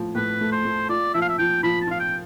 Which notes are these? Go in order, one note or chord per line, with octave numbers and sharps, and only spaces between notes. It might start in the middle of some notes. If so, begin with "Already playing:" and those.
Already playing: A2 F3
A2 B4
A3
C5
A3
F4 D5
F3 E5
F5
E5
F3 G5
F3 B5
A5
F4 F5
G5